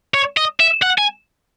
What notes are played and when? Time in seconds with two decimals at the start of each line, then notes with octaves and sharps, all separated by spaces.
0.14 C#5
0.37 D#5
0.60 E5
0.82 F#5
0.98 G#5